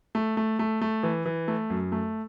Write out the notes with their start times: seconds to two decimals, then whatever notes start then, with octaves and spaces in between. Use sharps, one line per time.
0.15 A3
0.37 A3
0.59 A3
0.81 A3
1.03 E3
1.26 E3
1.48 A3
1.70 F#2
1.92 A3